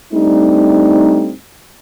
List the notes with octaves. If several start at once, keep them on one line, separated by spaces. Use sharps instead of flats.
G3 A3 C4 D4 D#4